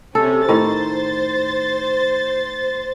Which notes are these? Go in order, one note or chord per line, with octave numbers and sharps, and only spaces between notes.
C3 C#4 A4
A2 D#3 C5 A6